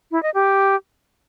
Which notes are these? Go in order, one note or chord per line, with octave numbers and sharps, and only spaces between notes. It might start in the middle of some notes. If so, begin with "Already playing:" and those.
E4
D#5
G4